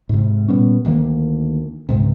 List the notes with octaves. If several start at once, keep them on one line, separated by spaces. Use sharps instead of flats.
G#2 C3
A#2 G3 B3 C#4
D2 D#3 A3 A#3
C#2 G#2 C3